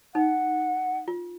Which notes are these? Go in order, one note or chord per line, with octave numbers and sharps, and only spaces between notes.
D#4 F#5
F4